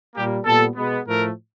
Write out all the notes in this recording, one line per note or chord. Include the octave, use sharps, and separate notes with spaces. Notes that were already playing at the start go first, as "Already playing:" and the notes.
A#2 G3 A#3 G4
A#2 G3 B3 A4
B2 G#3 B3
A2 F3 A3 A#4